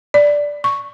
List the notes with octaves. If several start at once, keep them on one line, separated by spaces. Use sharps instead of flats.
D5
C#6